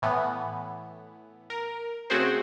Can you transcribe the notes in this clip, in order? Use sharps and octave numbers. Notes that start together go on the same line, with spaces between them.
A2 E3 B3
A#4
C#3 A3 C4 F#4 G#4 C5